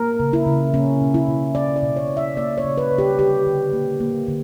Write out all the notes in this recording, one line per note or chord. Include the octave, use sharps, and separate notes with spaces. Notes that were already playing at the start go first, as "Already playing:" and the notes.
Already playing: A#3 A#4
C#3
E4
C#3
A#3 C#4
B2
E4
B2
A#3 D5
D5
B2
C#5
B2
E5
A#3 D5
C#5
C#3
B4
C#3
G4
D3 G4
D3
A#3
A#3
D3